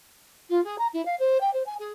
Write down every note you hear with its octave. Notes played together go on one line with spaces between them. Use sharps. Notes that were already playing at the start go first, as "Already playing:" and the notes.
F4
G#4
A#5
E4
F5
C5
G5
C5
G#5
G#4